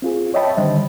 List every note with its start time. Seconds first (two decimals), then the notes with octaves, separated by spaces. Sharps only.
0.02 C4 F4 G#4
0.34 C#5 D#5 E5 G5 A5 B5
0.57 D3 D#3 G3 C5 D#5